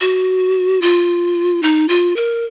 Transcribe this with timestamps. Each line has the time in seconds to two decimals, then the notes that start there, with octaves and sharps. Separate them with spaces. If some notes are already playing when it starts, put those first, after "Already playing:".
0.01 F#4
0.82 F4
1.63 D#4
1.88 F4
2.16 A#4